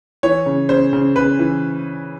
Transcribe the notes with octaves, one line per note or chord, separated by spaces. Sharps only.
E3 C#5
C#3
C#3 C5
C#3
C#3 B4
E3